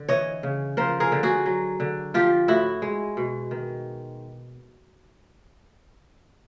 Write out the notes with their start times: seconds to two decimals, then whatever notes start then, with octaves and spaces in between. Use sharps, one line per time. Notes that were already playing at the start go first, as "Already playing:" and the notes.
Already playing: D3
0.09 E3 C#5 D#5
0.43 C#3
0.77 F3 A#4 C5
1.00 G#4 A#4
1.12 D3
1.23 F#4 G#4
1.46 F#3
1.80 D3
2.14 F3 F4 G4
2.48 A2 E4 F#4
2.82 G#3
3.17 B2
3.51 D#3